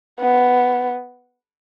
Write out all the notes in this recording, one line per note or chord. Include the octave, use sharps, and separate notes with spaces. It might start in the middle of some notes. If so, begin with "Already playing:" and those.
B3